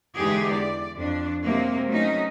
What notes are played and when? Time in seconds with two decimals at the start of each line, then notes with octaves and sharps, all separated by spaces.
0.18 E2 D3 G#3 D#4 G4 G#4
0.53 D5
0.98 F2 D4
1.44 C3 F#3 G#3 A#3 C4
1.87 F#3 A3 C#4 D#4